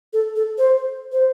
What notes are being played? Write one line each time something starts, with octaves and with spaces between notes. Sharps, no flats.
A4
A4
C5
C5